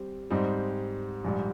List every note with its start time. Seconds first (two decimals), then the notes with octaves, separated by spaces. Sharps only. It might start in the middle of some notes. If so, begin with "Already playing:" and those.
Already playing: G3 C4
0.30 G#2 G3 C4 D#4
1.24 A#1 G#2 G3